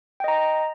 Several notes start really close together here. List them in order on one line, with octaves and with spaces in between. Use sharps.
G5 D#5 A#5